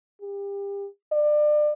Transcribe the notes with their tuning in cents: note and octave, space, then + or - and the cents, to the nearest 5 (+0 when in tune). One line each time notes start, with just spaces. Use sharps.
G4 +30
D5 +30